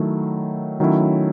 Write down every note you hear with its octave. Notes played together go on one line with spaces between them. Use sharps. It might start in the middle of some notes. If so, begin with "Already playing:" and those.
Already playing: D#3 F#3 A3 E4
D#3 F#3 A3 C#4 E4